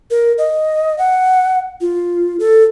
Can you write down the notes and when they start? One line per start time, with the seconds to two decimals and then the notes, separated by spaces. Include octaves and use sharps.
0.11 A#4
0.38 D#5
0.98 F#5
1.81 F4
2.40 A4